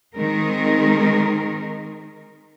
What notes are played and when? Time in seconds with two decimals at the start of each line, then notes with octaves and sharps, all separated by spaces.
0.16 D#3 G#3 C4 A#4